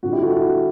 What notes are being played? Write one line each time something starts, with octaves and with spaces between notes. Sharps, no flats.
G2 D3 F#4
E4 G4
F#4 A4
E4
F#4